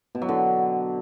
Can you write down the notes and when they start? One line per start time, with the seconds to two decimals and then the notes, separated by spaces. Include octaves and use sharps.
0.15 B2
0.22 F#3
0.29 D3